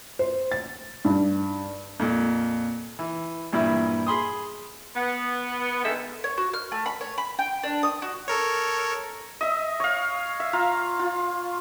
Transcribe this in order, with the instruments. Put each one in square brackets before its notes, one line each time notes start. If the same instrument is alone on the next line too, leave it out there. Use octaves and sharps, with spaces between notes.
[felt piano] C5
A6
G2
[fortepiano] F2 A#2
E3
G2 A#2 E3 E4
G#4 B5 C6 D#6
[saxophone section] B3
D3 D#3 G#3 A4 E5
[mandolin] C#5
F#4
F6
A3
B5
C#5
B5
G5
D4
D#6
F#4
[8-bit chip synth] A4 A#4 C#5
[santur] D#5 E5
C#5 F5
E5
F4 F5 A#5
F4